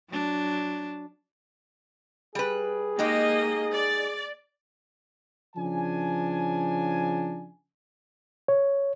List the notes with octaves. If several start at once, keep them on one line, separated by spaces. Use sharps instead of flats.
F#3 D4
G3 G#4 B4
G#3 A#3 D#4 G4 D#5
D5
C#3 F3 D4 G#5
C#5